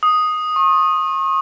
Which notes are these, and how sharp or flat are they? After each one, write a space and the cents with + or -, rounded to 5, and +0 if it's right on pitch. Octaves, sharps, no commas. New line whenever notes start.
D#6 +0
C#6 -40